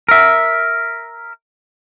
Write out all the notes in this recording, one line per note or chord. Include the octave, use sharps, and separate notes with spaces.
A#4 E5